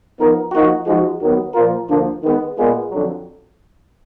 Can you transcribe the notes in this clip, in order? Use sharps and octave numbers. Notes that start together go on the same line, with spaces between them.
F3 B3 D#4 A#4
F3 A#3 D#4 F#4
F3 G#3 D#4 F#4
D#2 D#3 F#3 B3
A#2 F3 A#3 F4 A#4
D2 D3 F3 A#3 D4
D#3 G#3 B3
A#2 G#3 B3 F4 G#4
F2 D3 F#3